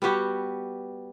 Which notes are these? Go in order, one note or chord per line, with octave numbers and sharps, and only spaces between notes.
G3 B3 F#4 G4